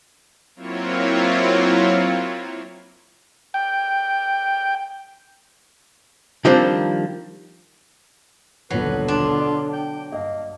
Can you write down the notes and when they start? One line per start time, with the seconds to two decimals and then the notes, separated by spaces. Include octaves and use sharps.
0.56 F#3 A#3 C4 E4 F4 C#5
3.54 G5
6.45 D#3 F3 G3 A#3 C4 D4
8.70 D#1 A#1 B2 D3 F#3 B4 C7
9.08 D4 F4
9.40 C#5 D5
9.73 G5
10.12 G2 A#3 D#5